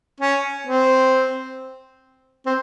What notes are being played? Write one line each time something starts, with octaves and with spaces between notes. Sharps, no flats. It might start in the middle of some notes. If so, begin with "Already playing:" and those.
C#4
C4
C4